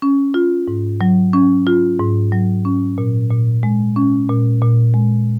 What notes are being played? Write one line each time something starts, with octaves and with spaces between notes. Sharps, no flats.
C#4
F4
G#2
F#3
C#4
F4
G#2
F#3
C#4
A#2
A#2
G#3
C#4
A#2
A#2
G#3